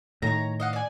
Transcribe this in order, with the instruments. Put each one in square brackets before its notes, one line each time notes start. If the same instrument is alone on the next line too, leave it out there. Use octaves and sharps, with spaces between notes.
[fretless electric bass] A2 D#3 [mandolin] C#5 A#5
[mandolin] D#5 F5 F#5
D5 G#5